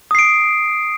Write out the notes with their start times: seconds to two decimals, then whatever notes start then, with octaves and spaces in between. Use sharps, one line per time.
0.11 D#6
0.15 C7
0.19 D7